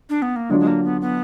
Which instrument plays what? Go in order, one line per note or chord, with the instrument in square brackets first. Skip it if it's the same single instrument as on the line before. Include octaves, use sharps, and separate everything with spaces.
[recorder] D4
B3
A#3
[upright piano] D3 F#3 D4 F4 [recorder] G#3
[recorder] G#3
A#3
B3
B3